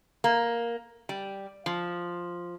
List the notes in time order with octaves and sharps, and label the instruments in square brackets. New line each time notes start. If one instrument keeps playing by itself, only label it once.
[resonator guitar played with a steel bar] A#3
G3
F3